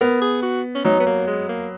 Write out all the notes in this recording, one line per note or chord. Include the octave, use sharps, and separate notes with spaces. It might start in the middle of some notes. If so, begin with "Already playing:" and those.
B3 A#4
G#4
F#4
C#4
F#3 D#4
B3
A#3
G#3
A#3